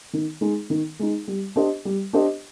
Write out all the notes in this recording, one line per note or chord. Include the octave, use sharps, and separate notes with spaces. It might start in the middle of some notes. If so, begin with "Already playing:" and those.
D#3
G#3 D#4
D#3
G#3 D#4
G3
D4 G4 C5 D#5
G3
D4 G4 C5 D#5